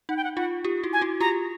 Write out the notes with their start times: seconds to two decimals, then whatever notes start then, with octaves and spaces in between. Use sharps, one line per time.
0.09 D#4 F#5
0.17 G5
0.24 F#5
0.36 D#4 F4 F#5
0.64 F4 G4
0.83 E4 F#4
0.93 G#5
1.01 E4 F#4
1.20 F4 G4 A#5